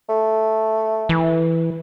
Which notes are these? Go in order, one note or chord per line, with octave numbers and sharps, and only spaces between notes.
A3
E3